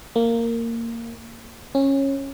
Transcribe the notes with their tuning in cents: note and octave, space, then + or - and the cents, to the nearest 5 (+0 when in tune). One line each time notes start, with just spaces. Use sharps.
A#3 -15
C#4 -20